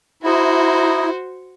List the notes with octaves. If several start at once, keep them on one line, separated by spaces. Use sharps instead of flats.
D#4 E4 F#4 C5